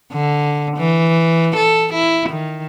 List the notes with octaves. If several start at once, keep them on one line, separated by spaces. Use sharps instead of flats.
D3
E3
A4
E4
D#3